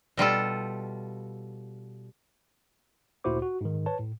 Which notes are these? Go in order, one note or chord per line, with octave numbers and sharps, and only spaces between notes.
B2 G3 F4 A4
D2 A#2 E4 F#4 C5 D6
F#4
G#2 D#3
B4 C#5 A5
A2